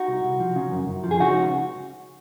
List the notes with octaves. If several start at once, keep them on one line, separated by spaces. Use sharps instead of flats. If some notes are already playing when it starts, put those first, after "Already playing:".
Already playing: D#4 F#4
C2
C2
F3
C#3
F#2
F#2
F3
G#4
C#3 D#4 F#4
C#2